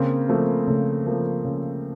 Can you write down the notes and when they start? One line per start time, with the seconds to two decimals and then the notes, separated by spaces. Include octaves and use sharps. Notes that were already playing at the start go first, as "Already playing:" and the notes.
Already playing: C#3 A#3 C4
0.28 F3 A3 A#3
0.67 C#3 A3
1.06 F3 A3 A#3
1.45 C#3